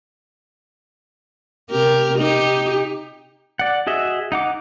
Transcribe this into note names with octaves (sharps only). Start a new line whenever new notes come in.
C3 G4 A#4
D#4 G4
D5 F#5
F#4 G#4 D#5 E5
D#4 F#5 D6